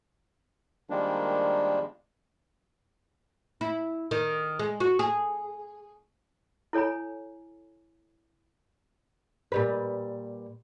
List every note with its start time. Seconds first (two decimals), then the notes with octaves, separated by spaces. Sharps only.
0.90 D#3 F3 G3 G#3 A#3 D4
3.61 E4
4.11 D#3
4.59 G#3
4.80 F#4
4.99 G#4
6.73 E4 A4 C#5 G#5 A#5
9.52 A#2 G3 B4